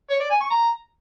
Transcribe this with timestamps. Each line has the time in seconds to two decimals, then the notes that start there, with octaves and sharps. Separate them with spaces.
0.10 C#5
0.20 D5
0.30 G#5
0.40 C#6
0.50 A#5